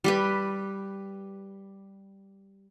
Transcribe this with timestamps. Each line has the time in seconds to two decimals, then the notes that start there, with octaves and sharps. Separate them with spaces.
0.04 G3 G4 B4